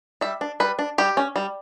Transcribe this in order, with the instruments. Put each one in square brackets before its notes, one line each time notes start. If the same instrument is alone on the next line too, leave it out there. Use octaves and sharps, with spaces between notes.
[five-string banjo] G3 E5
D4
G3 B4
D4
G3 G4
C#4
G3